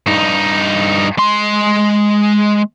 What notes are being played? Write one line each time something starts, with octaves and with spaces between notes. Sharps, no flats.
G2 D#4
G#3 C6